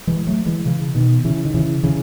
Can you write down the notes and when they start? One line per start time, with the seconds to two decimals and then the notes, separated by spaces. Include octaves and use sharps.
0.07 E3 G#3
0.27 F#3 A3
0.46 E3 G#3
0.66 C#3 E3
0.95 B2 D#3
1.25 C#3 E3
1.45 D#3
1.54 C#3 E3
1.83 C#3 E3